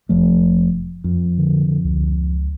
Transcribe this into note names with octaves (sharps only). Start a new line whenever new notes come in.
F1 F3 A3
F2
D3
D3
C#2